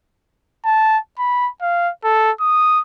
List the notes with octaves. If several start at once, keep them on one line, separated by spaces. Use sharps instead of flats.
A5
B5
F5
A4
D#6